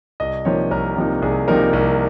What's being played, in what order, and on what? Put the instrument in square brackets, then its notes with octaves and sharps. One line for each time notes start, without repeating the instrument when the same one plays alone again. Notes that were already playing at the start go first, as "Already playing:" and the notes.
[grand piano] C2 D#5
C3 F3 A#3 D#4 C#5
C2 A#4
C3 F3 A#3 D#4
C2 G#4
C3 F3 A#3 D#4 A#4
C2